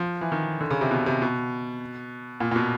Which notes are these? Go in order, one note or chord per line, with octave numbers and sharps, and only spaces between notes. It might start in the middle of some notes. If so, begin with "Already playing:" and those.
Already playing: F3
E3
D#3
D3
C#3
C3
B2
C3
B2
A#2
A#2
B2